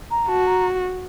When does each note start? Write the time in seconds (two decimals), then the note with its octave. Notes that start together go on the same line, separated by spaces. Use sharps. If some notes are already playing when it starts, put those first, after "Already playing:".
0.11 A#5
0.28 F#4 A5
0.47 A#5